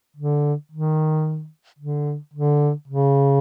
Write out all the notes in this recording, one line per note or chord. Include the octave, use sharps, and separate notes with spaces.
D3
D#3
D3
D3
C#3